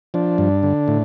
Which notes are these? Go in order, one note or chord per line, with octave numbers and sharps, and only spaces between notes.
F3 D4
G2
D3
A2